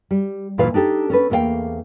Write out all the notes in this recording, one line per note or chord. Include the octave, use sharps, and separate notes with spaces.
G3
D2 A#2 E3 F4 B4 F5
D4 D#4 G4 A4
C#4 A4 B4
E2 A3 A#3 A#4 F5 G5